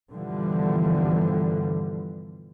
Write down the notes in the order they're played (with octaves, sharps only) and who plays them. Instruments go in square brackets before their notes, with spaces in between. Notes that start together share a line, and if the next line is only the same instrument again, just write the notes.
[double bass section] G2 B2 D3 E3 F3 G3